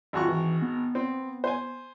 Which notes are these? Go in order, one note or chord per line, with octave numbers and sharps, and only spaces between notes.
G#1 F4 F#4 C#6
E3
B3
C4
C5 G#5